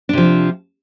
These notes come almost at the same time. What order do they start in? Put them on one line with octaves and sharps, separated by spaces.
D4 C3 F3